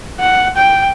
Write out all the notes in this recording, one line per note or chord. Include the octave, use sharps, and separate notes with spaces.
F#5
G5